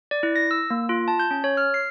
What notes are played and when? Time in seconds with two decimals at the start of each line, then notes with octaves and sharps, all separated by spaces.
0.11 D5
0.23 E4
0.36 A#6
0.51 E6
0.70 A#3
0.89 F4
1.08 A5
1.19 G6
1.31 C#4
1.44 C#5
1.57 F6
1.74 C7